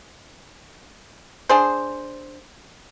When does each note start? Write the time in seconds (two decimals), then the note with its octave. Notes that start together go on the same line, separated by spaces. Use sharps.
1.49 D4 G#4 C5